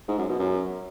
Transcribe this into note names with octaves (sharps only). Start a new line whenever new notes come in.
G#2
F#2
B2
F#2